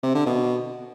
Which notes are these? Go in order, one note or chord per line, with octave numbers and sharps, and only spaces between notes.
C3
D3
B2